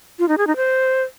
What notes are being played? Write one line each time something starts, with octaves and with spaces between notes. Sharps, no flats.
F4
D#4
G#4
D#4
C5